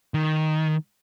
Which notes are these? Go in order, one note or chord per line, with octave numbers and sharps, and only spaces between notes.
D#3